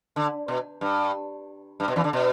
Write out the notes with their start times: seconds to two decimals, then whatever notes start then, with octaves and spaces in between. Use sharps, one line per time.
0.16 D3
0.48 B2
0.81 G2
1.80 G2
1.88 B2
1.96 E2 E3
2.04 D3
2.13 B2